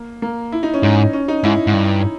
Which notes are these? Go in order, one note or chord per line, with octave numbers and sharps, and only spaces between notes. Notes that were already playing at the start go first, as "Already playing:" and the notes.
Already playing: A#3
A#3
E4
D#4
C#4
G#2 D#4
C#4
D#4
G#2 E4
G#2
G2